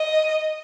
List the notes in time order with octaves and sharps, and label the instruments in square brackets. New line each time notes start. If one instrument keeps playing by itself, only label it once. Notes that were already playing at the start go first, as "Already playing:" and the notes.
Already playing: [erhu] D#5